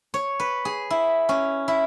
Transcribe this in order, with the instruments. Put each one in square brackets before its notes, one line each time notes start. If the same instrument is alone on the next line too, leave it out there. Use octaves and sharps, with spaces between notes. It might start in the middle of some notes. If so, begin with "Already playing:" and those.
[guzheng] C#5
B4
G#4
E4
C#4
E4